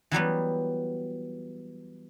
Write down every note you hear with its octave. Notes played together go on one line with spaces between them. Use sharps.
E3 F#3 G3 B3